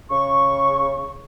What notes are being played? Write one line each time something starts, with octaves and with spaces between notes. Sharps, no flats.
C#3 C#6